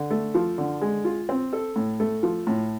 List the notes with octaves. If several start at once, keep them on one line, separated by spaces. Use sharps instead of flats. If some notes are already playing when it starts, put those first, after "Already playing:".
Already playing: D3
A3
F3
D3
G#3
F4
C4
A4
A2
A3
F3
A2